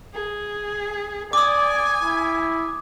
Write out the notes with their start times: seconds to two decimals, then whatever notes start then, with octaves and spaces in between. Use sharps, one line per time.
0.13 G#4
1.33 D5 G#5 D6 D#6
2.03 E4